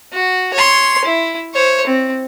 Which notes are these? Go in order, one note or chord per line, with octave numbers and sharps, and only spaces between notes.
F#4
C#5 C6
E4
C5 C#5
C4